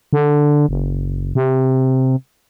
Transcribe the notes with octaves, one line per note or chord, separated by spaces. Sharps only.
D3
F#1
C3